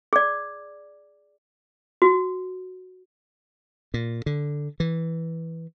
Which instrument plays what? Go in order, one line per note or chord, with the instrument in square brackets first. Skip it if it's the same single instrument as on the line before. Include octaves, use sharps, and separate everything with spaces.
[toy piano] G#4 D5
F#4
[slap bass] A#2
D3
E3